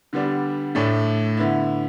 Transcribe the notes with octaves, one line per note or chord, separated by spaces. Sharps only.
D3 G3 B3 D4
A2 A3 D4
D3 B3 E4